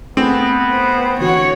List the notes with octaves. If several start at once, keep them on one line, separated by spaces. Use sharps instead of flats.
A3 B3 C4 G#4
C5
D3 E3 F#4 C#5 F#5